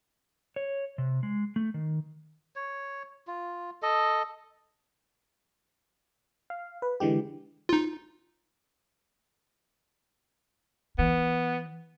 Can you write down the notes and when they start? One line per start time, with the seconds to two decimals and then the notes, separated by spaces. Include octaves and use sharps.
0.56 C#5
0.98 C3
1.23 G#3
1.56 A3
1.74 D#3
2.56 C#5
3.27 F4
3.83 A4 D#5
6.50 F5
6.82 B4
7.00 D3 E3 G#3 G4
7.69 D#4 F4
10.99 E3 B3